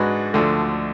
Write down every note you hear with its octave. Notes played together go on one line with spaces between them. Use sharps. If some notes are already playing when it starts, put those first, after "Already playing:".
Already playing: G#2 G#3 D4 F#4 B4
D2 D3 F3 A3